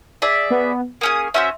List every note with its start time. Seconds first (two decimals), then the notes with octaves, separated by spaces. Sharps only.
0.22 G#4 D5 E5
0.50 B3
1.01 A#3 C#4 G#4 D#6
1.34 C#4 F#4 C5 E5